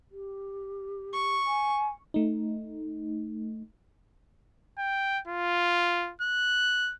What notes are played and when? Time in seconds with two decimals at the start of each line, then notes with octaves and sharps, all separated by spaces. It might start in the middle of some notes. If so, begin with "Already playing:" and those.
0.11 G4
1.13 C#6
1.47 G#5
2.14 A3 D#4
4.78 G5
5.27 F4
6.21 F#6